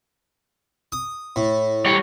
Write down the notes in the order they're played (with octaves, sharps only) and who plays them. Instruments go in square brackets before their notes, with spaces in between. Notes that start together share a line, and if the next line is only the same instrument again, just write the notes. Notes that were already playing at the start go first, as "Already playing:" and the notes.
[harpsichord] D#6
A2
[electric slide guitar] G3 C#5